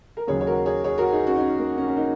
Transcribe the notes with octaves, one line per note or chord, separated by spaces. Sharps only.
A#4
D#2 C#3 F#3 G#4 C#5
C#5
F#4 A#4
G#4 C#5
G#4 C#5
F#4 A#4
D#4 G#4
C#4 F#4
D#4
C#4
A#3
C#4
C#4
A#3 D#4